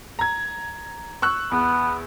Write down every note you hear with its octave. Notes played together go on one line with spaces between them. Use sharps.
A#5 G#6
C#6 E6 F#6
E2 B3